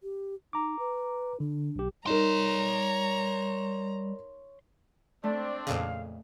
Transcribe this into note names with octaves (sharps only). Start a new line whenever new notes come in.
G4
D#4 A#5 D6
B4
D3 D4
B1 G4
G3 D#4 A#4 C#5 A#5 C6
A3 C4 D4 D5
F2 A#2 C#3 F5